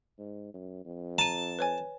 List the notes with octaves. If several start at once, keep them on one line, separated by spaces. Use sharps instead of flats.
G#2
F#2
F2
A5 A#5 D#7
B4 C#5 G#5